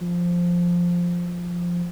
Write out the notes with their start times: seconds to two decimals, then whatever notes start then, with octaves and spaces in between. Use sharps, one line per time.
0.01 F3